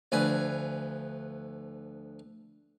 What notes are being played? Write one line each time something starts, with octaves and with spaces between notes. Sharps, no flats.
D2 F3 B4 G#5